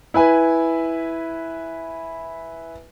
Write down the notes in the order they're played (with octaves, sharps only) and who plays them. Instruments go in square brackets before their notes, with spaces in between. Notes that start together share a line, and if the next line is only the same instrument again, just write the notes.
[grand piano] E4 B4 G#5